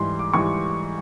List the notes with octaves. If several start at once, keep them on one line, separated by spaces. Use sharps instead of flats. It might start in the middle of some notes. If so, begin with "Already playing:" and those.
Already playing: G#2 E3 G3 C6
D6
G#2 E3 G3 C#6